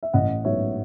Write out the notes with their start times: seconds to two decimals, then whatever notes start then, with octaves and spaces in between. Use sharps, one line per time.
0.03 E5
0.13 A1 D#5 F#5
0.44 G#2 F#3 B3 D#4 C#5 E5